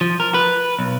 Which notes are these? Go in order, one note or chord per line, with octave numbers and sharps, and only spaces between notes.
F3
A#4
B4
B1